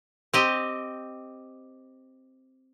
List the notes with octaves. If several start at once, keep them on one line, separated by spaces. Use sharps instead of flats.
C4 G4 D#5